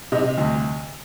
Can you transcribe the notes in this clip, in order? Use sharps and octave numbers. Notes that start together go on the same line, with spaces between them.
C3 D#5
D2